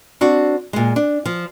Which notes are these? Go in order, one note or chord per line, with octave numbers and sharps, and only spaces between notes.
C4 D4 F#4
A#2 G#3
D4
F3